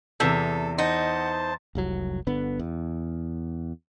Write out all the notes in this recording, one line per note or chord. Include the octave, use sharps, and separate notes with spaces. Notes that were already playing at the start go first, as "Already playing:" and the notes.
E2 C3 A4 E6
D#4 C5 F#5 A5
F1 C2 F#3
G1 D3 B3
E2